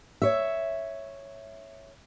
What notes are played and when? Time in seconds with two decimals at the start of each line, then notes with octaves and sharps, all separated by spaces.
0.22 C#5 E5